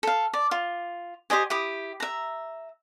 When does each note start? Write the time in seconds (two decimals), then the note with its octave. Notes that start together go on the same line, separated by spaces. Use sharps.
0.03 A4 F5
0.33 D5
0.51 F4
1.30 G4 C5 D#5 G#5
1.50 E4 G4 D#6
2.00 E5 A#5